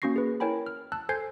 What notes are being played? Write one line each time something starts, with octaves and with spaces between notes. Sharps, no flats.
A#3 C#4 F#4 C#6 A#6 C7
G#4 B4
E4 A#4 C#5 G5 G#5 B5
F6
A5 E6 F#6
A4 C5 G#5 G6 G#6 C7